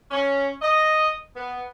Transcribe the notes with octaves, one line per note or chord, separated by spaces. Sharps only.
C#4
D#5
B3